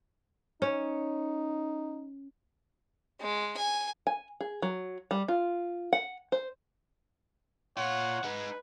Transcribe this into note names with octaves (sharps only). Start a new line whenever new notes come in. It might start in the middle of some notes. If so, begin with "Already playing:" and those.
C#4 D#4
G#3
G#5
G#5
G#4
F#3
G3
F4
F#5
C5
A#2 F4 C#5 F#5
G#3 D#4 B4